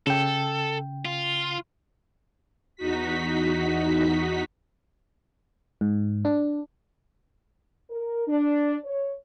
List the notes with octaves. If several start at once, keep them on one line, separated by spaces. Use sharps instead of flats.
C#3 A4 G5
F4
E2 D#4 F#4 B6
G#2
D4
A#4
D4
C#5